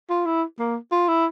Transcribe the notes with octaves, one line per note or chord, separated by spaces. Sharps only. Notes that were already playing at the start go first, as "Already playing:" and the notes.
F4
E4
A#3
F4
E4